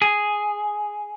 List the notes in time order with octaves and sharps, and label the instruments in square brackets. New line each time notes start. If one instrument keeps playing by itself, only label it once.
[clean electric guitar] G#4